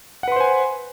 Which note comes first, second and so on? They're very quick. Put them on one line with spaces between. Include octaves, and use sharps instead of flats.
F#5 B4 C6 C5 G#5